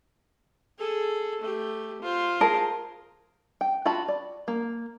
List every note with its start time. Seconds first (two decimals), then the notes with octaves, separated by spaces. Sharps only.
0.78 G#4 A4
1.41 A3 G4
2.02 F4 C5
2.41 G#4 A#4 A5
3.61 G5
3.85 F4 F#4 A5 B5
4.08 D5
4.48 A#3